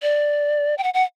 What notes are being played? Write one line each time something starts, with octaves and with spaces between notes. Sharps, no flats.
D5
G5
F#5
F#5